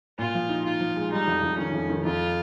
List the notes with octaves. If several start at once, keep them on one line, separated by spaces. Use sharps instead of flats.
A#2 F4
F3
D#4
D#4 F4
F3
G#3
G3 D#4
F2
F2
D#3 C#4
F2
D#3
F2 F4